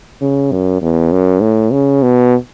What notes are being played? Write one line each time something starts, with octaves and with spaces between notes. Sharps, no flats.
C#3
F#2
E2
F#2
A2
C#3
B2